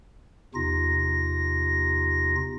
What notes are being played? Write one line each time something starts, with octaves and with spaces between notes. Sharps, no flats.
E2 C3 D#4 F4 A#6